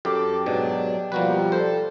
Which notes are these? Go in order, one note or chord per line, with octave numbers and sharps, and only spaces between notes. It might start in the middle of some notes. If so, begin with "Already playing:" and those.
F#2 G4 A4 D6
G#2 B2 F#3 D4
B2 F3 G3 A#3 F#4 B4
A4 C5